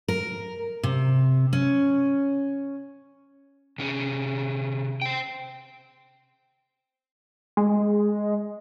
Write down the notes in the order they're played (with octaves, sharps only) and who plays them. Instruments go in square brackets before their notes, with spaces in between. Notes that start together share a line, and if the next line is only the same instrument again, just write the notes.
[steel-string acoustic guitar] A#4
C3
C#4
[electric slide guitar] C3 C#4 G#4
C5 G5
[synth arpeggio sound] G#3